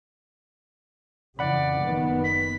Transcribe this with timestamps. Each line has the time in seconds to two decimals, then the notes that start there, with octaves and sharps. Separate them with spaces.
1.39 F2 C#3 E3 D5 F#5 B5
1.83 F#1 D#3 B3
2.24 B6